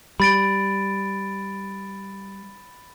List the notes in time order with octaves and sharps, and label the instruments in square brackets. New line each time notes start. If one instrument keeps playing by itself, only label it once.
[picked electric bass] G3 [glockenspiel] B5 A6 D7